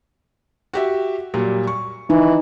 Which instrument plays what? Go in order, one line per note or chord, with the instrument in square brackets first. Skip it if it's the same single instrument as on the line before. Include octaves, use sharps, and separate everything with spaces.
[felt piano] F#4 G4 E5
A#2 F#3 G3
C#6
[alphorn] E3 [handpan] D#4